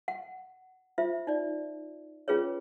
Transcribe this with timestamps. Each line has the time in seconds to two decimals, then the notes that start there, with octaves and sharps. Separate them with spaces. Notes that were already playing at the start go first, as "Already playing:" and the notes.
0.08 F#5
0.98 F4 C5 E5
1.27 D#4 D5
2.28 C#4 F4 G#4 B4 C#5